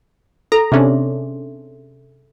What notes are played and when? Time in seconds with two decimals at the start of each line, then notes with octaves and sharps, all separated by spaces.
0.52 A4 A#5
0.72 C3 C#4 D4 G#4 E5 C6